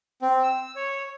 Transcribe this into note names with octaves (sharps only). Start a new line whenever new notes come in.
C4
E6
C#5